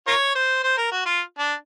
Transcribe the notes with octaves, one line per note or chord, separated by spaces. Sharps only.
F4 A#4 C#5
C5
C5
A#4
F#4
F4
D4